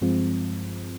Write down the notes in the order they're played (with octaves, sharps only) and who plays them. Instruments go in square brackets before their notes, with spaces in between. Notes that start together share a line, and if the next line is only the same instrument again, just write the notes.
[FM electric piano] G2 F3 G#3 C4 F4